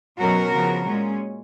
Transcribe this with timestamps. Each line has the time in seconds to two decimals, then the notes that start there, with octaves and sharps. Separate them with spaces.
0.21 B2 F#3 C#4 F#4 A#4
0.55 C#3 F3 B3
0.87 A#2 G#3 C#4